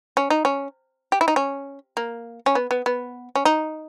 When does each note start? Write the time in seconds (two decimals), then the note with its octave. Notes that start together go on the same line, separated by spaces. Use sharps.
0.17 C#4
0.30 D#4
0.45 C#4
1.12 G4
1.21 E4
1.28 D#4
1.36 C#4
1.97 A#3
2.46 C#4
2.55 B3
2.71 B3
2.86 B3
3.35 C#4
3.45 D#4